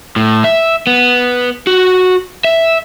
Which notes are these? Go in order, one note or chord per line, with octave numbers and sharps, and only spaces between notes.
A2
E5
B3
F#4
E5